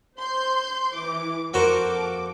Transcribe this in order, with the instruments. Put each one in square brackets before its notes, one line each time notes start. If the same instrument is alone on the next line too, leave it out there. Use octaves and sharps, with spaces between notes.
[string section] C5 C6 G6
E3 D6
[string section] F2 A4 D6 [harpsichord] A#3 F#4 C5